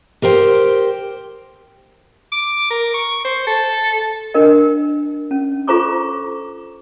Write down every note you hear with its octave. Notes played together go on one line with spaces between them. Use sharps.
G4 A#4 C5 G5
D6
A#4
C#6
C5
A4
D4 A#4 D#5
C#4
F4 A4 C5 A#5 C#6 D6